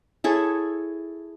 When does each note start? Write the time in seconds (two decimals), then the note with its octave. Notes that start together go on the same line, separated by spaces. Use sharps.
0.24 E4 G#4 A4 C#5